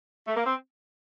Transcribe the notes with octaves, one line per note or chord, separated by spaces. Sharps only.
A3
A#3
C4